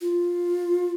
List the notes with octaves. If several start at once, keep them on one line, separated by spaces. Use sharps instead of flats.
F4